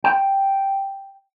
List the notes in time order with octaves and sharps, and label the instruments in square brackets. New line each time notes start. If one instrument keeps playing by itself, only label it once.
[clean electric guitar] G5